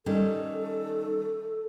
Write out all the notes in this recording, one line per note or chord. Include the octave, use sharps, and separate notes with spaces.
D#3 G3 C#4 A4